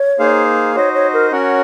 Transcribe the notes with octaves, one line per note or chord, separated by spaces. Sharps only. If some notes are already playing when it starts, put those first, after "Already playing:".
Already playing: C#5
A#3 D#4 G#4 C5 F5
D#4 F#4 C5 C#5 D#5
C#5
A#4
C#4 F#4 A#4 C#5 F#5